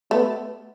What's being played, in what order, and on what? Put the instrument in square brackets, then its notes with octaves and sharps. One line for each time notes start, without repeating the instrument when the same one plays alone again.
[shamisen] A3 [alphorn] B3